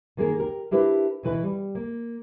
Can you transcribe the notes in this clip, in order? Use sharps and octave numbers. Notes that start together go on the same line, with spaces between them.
D#3 A#3 G#4 A#4
G4 A#4
D4 E4 G4 A#4 B4
B2 E3 B4
G3
A#3